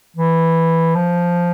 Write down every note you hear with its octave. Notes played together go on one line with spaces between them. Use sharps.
E3
F3